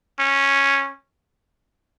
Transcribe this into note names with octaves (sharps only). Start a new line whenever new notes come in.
C#4